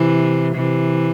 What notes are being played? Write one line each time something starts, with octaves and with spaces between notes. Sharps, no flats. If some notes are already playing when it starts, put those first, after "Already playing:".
Already playing: C3 E3
C3 E3